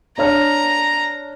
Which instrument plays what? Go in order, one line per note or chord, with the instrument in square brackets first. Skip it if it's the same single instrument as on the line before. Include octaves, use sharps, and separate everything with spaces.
[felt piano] D4 C#5 F6 [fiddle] A#5